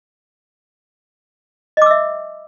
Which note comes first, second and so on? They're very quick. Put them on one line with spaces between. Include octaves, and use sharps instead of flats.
D#5 D6 E6 E5